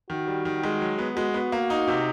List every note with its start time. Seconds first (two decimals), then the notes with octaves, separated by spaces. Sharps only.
0.10 D#3 F#4
0.27 G3
0.45 D#3
0.63 G#3
0.81 F#3
0.99 B3
1.16 G#3 F#4
1.34 B3
1.52 A#3
1.70 D#4
1.88 C3